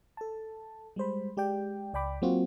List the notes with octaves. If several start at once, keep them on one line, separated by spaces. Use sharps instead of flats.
A4 A5
G3 G#3 C5 B5
G#3 G4 D5 G5
C#2 D5 G5 B5 D6
F#3 A#3 C4 F4 F#4